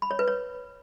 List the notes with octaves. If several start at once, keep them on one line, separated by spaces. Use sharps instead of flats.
B5
C#5
B4
C#5